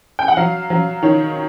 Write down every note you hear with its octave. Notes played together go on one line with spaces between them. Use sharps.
G5
F#5
F#3 F5
F#3
D#3 C#5